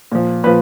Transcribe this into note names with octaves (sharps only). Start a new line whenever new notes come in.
A#2 F3
A#2 F3 B4